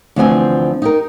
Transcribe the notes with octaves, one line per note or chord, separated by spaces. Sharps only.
D2 E3 F3 C4 E5 G#5
D#4 G4 A#4